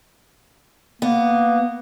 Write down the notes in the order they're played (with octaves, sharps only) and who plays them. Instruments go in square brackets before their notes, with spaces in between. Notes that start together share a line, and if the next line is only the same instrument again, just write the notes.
[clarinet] A#3 [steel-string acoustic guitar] B3